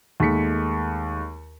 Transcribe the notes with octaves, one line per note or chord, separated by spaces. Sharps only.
D#2 G#3 A3 B6 C#7